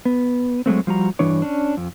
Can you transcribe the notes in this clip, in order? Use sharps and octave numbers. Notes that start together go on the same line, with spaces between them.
B3
F#3 G#3 A3 C4
F3 G3 F#4 A#5
G2 E3 D4 C#5
C#4 D4
F2